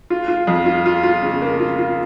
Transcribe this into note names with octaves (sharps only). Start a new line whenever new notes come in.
F4
F4
F2
F4
F4
F4
C#3
A#3
F4
F4